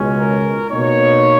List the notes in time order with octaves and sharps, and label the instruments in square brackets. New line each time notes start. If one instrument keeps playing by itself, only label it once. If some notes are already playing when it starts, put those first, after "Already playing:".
Already playing: [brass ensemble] C#2 B2 G#3 C#4
A#4
B2 A#3 D#4 C#5